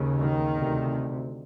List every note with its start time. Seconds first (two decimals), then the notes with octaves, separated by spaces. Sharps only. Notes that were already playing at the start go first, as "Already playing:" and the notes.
Already playing: D#2 C#3
0.19 D#3
0.56 D2 C3